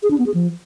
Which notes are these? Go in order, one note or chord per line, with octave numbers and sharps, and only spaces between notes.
G#4
D4
B3
G#4
F3